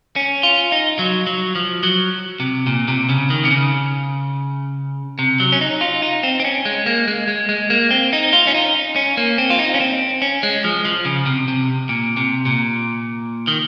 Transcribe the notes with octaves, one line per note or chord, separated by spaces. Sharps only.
C#4
F4
D#4
F#3
F#3
F3
F#3
C3
A#2
C3
C#3
D#3
C3
C#3
C3
F#3
C#4
D#4
F4
D#4
C4
C4
C#4
G#3
A#3
G#3
G#3
G#3
A#3
C4
D#4
F4
C#4
D#4
C#4
A#3
C4
F4
D#4
C#4
C4
C#4
G#3
F3
F3
C#3
C3
C3
A#2
C3
A#2
D#3